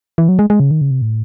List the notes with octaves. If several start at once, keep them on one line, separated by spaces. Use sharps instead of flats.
E3
F#3
G#3
G#3
C#3
D#3
C#3
C3
A2